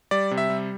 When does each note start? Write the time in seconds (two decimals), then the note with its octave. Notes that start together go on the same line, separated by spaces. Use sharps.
0.11 G3 D5
0.31 C3
0.38 E5
0.50 G3